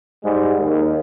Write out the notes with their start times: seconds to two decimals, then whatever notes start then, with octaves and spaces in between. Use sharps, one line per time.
0.24 G#2 G3 G#3
0.58 D#2